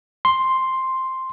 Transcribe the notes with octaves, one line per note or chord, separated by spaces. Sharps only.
C6